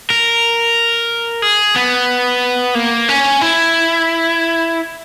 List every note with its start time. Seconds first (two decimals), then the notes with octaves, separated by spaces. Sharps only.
0.10 A#4
1.42 G#4
1.76 B3
2.75 A#3
3.09 C#4
3.41 E4